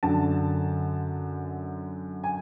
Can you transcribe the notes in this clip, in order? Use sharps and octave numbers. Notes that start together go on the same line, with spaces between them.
F#2 D3 A5
G#5